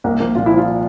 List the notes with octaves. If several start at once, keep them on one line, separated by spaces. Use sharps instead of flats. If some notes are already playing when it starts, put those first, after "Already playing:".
C2 A#3
F3 A#3
A#2 F4
F3 E4
F4